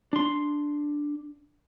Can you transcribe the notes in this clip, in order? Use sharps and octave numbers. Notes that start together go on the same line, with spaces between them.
D4 C6